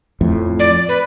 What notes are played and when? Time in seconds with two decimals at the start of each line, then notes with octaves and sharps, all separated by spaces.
0.21 F2 A2
0.60 D5
0.89 B4